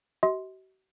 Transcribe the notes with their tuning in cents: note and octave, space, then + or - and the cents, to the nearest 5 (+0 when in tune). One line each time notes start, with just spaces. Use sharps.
F#4 +45 D#5 +45 C6 +0